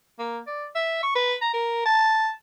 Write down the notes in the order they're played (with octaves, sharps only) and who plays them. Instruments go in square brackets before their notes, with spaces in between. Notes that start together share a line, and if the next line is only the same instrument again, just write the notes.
[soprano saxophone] A#3
D5
E5
C#6
B4
A#5
A#4
A5